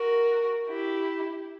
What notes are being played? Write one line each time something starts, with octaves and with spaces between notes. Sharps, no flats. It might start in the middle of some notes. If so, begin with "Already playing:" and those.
Already playing: F#4 A#4
E4 G4